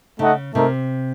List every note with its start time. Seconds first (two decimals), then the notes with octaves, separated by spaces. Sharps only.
0.19 C#3 A3 D#4 A4 D#5 F#5
0.54 C3 A3 D#4 A#4